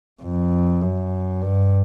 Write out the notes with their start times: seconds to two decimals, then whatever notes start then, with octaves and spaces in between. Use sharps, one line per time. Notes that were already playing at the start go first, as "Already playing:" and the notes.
0.23 F2
0.81 F#2
1.42 G2